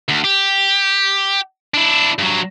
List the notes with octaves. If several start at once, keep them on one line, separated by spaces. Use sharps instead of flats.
D2
G4
D4 E4
G2 F#3